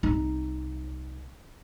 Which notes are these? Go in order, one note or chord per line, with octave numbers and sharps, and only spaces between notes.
C2 D#4